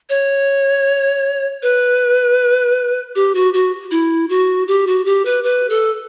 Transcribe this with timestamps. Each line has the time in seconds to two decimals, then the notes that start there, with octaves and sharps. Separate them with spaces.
0.10 C#5
1.63 B4
3.15 G4
3.35 F#4
3.54 F#4
3.91 E4
4.29 F#4
4.68 G4
4.87 F#4
5.06 G4
5.25 B4
5.44 B4
5.70 A4